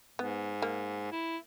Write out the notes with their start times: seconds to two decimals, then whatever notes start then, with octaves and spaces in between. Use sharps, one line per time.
0.19 G#2 B3
0.62 A#3
1.12 E4